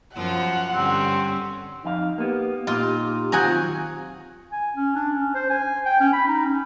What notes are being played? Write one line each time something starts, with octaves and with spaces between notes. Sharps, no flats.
F#2 F3 F4 F#5
G2 D3 C4 C#4
F2 D#4 F5
A#3 B3 G4
A#2 D#4 F4
D#3 F#3 C4 F4 F#5 G#5 A#5
G#5
C#4
D4
C#4
C5
G#5
G5
C#4
B5
D#4
C#4